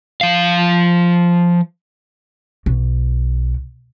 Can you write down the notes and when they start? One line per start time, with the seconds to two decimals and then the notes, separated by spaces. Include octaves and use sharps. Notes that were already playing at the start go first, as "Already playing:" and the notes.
0.21 F3 F5
2.66 B1